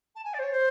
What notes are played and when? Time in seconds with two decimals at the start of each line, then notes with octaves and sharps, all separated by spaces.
0.15 A5
0.24 G#5
0.33 D5
0.38 C5
0.42 C#5
0.52 C5